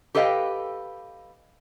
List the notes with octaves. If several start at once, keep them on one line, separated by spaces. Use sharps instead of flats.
G4 A4 B4 D#5 F5 G5